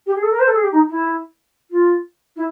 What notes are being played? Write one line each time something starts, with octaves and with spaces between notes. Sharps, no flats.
G4
G#4
A4
A#4
C5
A4
G#4
G4
D#4
E4
F4
E4